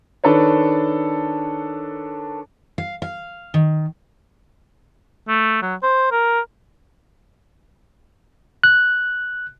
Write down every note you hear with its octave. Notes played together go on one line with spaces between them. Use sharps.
D#3 D4 A4 B4 C#5
F5
F5
D#3
A3
F#3
C5
A#4
F#6